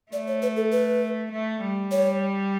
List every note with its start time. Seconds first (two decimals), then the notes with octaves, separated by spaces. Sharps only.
0.12 A3 D5
0.27 C#5
0.42 B4
0.57 A4
0.72 B4
1.31 A3
1.61 G3
1.92 C#5